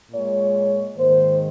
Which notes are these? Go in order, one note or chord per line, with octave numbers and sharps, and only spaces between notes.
A#2 G#3 C#5
G#2 D#3 A#3 C5